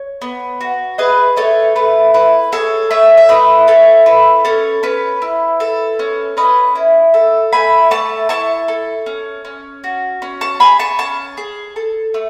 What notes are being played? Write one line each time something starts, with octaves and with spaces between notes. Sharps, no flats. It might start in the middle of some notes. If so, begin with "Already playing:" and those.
Already playing: C#5
B3
F#4
G#4 B4 D#5
A3 A4 C#5
A3 B4
E4 B4
G#4 A4 C#5
A3 C#5 E5
E5
A3 B4 D#5
E4 A4 C#5
A4 B4
C#4 A4 C#5
C#4 B4
E4
A4
C#4
C#4 B4 D#5
E4
A4
A3 G#5 B5
A3 A5 C#6
E4 A5 C#6
A4
C#4
C#4
F#4
C#4
A5 C#6
G#4 G#5 B5
A5 C#6
C#4 A5 C#6
G#4
A4
A3